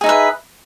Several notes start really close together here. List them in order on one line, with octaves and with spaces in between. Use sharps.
G#4 D#4 E5 B4